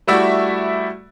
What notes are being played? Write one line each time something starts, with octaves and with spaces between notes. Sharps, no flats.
G3 A3 E4 F#4 D5 E5